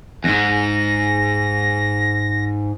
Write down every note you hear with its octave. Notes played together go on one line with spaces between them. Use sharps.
E2 G#2 A#6